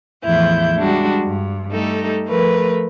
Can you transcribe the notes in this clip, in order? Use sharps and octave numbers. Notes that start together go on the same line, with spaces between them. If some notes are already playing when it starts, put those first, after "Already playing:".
E2 A2 E3 F3 E4 G6
G3 G#3 D4 F#4
G2
G3 A3 D#4 A4
F3 A3 A#4 B4